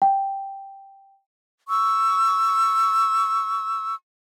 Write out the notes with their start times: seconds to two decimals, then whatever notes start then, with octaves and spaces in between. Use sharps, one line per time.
0.02 G5
1.69 C#6 E6